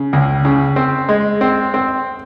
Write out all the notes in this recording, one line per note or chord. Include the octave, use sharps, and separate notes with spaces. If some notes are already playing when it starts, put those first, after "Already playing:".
Already playing: C#3
C#2
C#3
C4
G#3
C4
C4